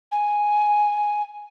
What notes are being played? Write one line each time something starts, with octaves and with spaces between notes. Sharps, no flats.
G#5